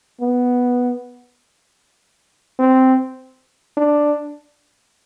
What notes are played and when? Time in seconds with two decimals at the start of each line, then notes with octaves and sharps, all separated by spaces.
0.21 B3
2.59 C4
3.77 D4